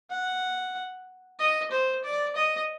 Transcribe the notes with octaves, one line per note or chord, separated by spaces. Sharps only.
F#5
D#5
C5
D5
D#5